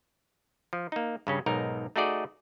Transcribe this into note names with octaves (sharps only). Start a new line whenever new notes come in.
F3
A#3 D#4
G2 C#3 C#4
B1 G#2 D#4 A#4
A3 D#4 F#4 G#4 D5 D#5